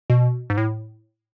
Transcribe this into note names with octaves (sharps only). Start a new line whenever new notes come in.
B2
G#2
A2